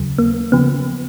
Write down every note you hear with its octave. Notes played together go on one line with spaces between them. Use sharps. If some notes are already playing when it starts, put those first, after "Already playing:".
Already playing: D#2 C#3 F#3
A#3
C#3 F3 B3